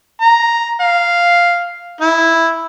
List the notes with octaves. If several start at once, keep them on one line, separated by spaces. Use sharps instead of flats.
A#5
F5
E4